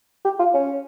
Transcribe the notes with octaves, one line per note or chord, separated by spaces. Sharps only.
G4
F4
C#4